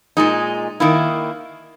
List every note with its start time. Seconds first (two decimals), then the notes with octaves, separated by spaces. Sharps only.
0.17 A#2 G#3 D#4
0.80 D#3 A#3 E4